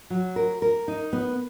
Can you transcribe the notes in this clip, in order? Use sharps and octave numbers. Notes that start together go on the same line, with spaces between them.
F#3
A#4
A#4
D#4
B3